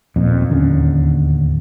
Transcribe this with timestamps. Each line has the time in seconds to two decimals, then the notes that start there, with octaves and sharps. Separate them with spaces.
0.16 D#1 F2 A#2
0.50 D1 D#2 D3 C#4